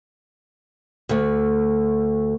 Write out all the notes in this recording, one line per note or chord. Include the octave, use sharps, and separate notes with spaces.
D2 A3